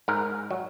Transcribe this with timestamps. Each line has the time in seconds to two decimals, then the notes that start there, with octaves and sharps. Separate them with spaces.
0.08 G#2 A#4
0.51 F#3